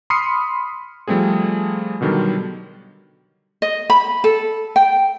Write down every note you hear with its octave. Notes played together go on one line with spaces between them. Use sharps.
B5 C6 D#6 F6 C7 C#7
F3 G3 A3 C4 G#4
B2 D3 D#3 F#3 G3
D#5
B5
A4
G5